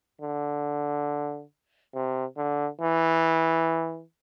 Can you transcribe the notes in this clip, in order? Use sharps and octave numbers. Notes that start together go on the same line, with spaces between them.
D3
C3
D3
E3